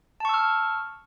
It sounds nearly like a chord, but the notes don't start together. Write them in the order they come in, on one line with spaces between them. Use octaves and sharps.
A5 C#6 E6 F6